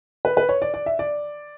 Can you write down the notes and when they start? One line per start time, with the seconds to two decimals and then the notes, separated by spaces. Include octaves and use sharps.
0.25 B4
0.37 B4
0.49 C#5
0.62 D5
0.74 D5
0.86 E5
0.99 D5